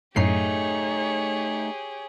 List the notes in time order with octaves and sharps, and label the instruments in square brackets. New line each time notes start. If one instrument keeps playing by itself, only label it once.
[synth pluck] F#2 A2 C7 [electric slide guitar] A3 D#4 [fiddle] G4 G#4 [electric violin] C#5